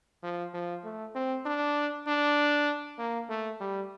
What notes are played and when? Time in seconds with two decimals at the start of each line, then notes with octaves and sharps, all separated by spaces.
0.23 F3
0.54 F3
0.84 A3
1.15 C4
1.46 D4
2.07 D4
2.99 A#3
3.29 A3
3.61 G3